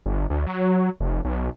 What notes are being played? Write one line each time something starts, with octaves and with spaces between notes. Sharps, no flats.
G1
D2
F#3
F1
B1